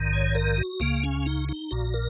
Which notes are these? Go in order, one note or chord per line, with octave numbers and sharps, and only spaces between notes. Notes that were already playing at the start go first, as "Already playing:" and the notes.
Already playing: A#1 G#2 D#3
C#5
A#4
F#4
C#2 C#3 A#3
C#4
D#4
D#4
A#1 A#2 F#4
A#4